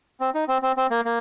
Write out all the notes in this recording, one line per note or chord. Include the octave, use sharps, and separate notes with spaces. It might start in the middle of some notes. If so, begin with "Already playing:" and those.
C4
D#4
C4
C4
C4
A#3
A#3